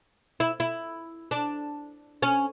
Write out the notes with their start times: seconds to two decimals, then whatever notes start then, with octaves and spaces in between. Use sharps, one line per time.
0.40 E4
0.60 E4
1.31 D4
2.22 C#4